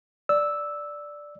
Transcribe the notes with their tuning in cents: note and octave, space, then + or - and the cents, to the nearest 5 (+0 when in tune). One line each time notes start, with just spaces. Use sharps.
D5 +0 E6 -5